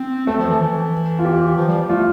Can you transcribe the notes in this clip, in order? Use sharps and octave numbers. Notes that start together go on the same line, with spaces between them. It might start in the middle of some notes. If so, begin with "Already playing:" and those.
Already playing: C4
A3 A4
F3
E3
E3
F4
G4
F3
G3
A3 F4